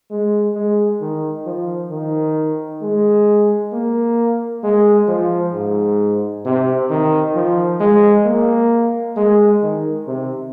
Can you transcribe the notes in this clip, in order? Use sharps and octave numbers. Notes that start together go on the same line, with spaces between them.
G#3
G#3
D#3
F3
D#3
G#3
A#3
G#3
F3
G#2
C3
D#3
F3
G#3
A#3
G#3
D#3
C3